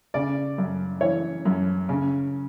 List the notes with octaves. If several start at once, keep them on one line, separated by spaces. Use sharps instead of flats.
C#3 D5
F#2
E3 C#5
F#2
C#3